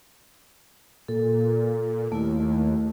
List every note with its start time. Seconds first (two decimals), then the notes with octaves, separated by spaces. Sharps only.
1.08 A#2 A4
2.12 D#2 A3 E4